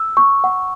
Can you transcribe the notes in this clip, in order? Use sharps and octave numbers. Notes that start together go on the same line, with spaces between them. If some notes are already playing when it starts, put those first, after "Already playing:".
Already playing: E6
C#6
F#5